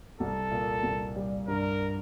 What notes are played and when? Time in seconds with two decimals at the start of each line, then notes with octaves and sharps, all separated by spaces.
0.20 C2 A4
0.51 A#2
0.83 C2
1.16 G3
1.48 G2 A#4